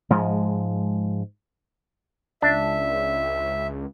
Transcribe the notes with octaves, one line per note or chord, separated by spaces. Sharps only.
G#2 F3 G#3
C#2 D4 E5